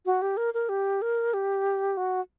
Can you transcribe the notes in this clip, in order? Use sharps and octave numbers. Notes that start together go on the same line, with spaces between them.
F#4
G4
A#4
A#4
G4
A#4
G4
F#4